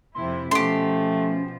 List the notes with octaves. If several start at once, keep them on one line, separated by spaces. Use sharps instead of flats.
F2 C3 E4 C6
B2 F3 A3 C#4 G4 C6